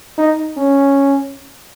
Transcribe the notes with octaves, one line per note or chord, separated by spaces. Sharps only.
D#4
C#4